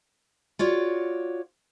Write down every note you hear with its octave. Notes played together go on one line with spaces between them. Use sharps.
F4 F#4 C#5 D5